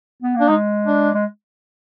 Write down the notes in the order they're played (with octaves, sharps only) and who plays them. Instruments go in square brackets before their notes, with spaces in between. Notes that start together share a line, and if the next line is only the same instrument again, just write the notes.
[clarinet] B3
[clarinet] A#3 [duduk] D4
[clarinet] G#3 [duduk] D#4
[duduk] D4
[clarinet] G#3